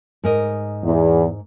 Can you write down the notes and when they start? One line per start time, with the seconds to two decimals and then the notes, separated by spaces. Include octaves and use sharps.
0.24 G#2 A#4 D#5
0.83 E2